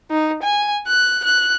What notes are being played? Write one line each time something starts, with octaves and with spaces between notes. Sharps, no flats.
D#4
G#5
F#6
F#6